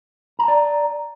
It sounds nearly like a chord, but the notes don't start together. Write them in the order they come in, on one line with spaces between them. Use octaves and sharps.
A#5 A5 D5